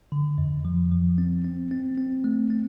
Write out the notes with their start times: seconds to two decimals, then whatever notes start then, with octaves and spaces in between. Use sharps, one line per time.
0.12 D3
0.38 F2
0.65 F3
0.91 F3
1.18 C4
1.44 C4
1.71 C4
1.98 C4
2.24 A3
2.50 C4